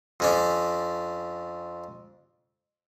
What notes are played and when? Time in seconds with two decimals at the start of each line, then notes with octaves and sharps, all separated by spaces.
0.20 F2 C#4 D4